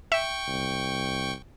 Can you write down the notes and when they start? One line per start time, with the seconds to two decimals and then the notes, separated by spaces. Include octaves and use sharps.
0.12 E5 G5 C#6
0.48 C2